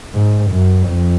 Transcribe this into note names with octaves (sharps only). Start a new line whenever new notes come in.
G#2
F#2
F2